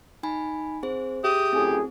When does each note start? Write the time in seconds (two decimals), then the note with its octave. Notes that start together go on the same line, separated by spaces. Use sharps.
0.23 D#4 G#5 B5
0.83 C4 G#4 C5
1.24 G4 G#4 E5 D#6
1.53 F#2 A2 C4 G#4